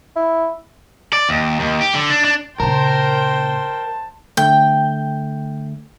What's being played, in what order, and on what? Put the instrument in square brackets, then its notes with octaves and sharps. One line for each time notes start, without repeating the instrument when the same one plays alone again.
[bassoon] E4
[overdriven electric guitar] D5
D#2
D#2
G4
D3
D4
D4
[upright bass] A#2 C#3 [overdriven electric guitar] A#4 [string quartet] C5 G5 C6 [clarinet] A5
[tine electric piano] D3 A3 [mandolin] G5